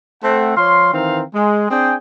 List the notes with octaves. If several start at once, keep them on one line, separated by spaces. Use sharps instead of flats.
A3 C4 F#5
F3 C#5 F5 C6
D#3 E3 C4 A#4 C5 F5
G#3
C4 D4 G#4 D5 G5 G#5